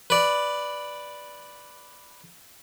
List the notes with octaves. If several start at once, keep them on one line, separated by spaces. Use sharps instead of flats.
B4 D5